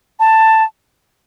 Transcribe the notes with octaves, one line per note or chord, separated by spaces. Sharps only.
A5